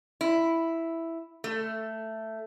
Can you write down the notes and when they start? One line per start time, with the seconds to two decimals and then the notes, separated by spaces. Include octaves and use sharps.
0.21 E4
1.44 A3